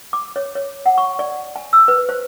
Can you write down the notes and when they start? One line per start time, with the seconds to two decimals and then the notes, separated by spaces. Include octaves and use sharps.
0.13 D6
0.36 C#5
0.55 C#5
0.86 F#5
0.98 C#6
1.19 D5
1.56 G#5
1.73 E6
1.88 B4
2.09 C5